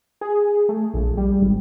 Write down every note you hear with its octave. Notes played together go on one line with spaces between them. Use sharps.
G#4
A3
A#1
G3
G#1